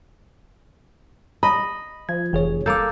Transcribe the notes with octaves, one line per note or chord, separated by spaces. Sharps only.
D#5 B5
F3 G#6
F1 E3 G#4 C#5
A#3 A4 D6 G6